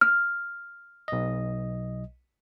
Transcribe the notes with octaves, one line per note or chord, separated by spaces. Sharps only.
F6
B1 D#5